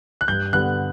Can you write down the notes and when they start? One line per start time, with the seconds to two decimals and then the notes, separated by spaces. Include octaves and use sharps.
0.21 F#6
0.28 G2 G6
0.53 D3 G3 B3 F#6